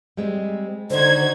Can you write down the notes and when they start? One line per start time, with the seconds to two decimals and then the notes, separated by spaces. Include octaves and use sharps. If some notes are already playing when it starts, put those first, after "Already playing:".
0.17 G3 G#3 C4
0.90 D3 D#3 D#4 F#4 C5 G#6